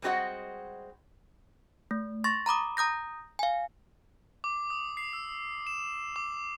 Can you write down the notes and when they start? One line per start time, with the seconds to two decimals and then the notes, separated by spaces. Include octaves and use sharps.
0.02 G3 G#3 C4 F#4 D#5 F#5
1.91 A3
2.24 C6 C#6 A6 A#6
2.46 A#5 B5 D6 D#6
2.77 A#5 D#6 G6 A#6
3.39 F5 G#5
4.44 D6
4.70 D#6
4.97 C7
5.13 E6
5.67 E7
6.16 D6